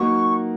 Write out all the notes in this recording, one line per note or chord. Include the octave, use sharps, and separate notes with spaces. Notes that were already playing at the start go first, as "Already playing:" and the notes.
Already playing: F#3 A#3 D#4 F#4 C#6